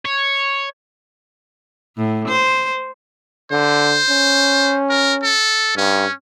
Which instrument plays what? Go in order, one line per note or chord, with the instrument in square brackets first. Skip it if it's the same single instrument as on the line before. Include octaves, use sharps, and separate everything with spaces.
[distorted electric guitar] C#5
[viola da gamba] A2
C5
[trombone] D3 [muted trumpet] C5
[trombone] C#4
[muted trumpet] A#4
A4
[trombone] G2 [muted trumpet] C#4